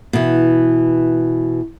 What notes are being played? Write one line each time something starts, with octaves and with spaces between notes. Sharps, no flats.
B2 E3